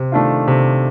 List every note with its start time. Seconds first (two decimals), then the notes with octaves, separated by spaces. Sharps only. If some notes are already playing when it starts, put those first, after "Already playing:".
Already playing: C3
0.12 D#3 A3 D4 F4
0.48 C3